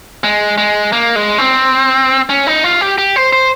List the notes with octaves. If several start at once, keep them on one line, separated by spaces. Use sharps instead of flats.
G#3
G#3
A#3
G#3
C4
C#4
D#4
F4
G4
G4
C5
C5